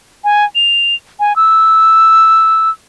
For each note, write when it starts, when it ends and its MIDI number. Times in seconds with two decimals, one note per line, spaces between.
0.24 0.44 80
0.55 0.95 101
1.20 1.35 80
1.36 2.70 88